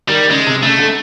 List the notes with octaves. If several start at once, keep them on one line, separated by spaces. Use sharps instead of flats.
D#3 G3
C#3 G#3
C3
C#3 A3
D3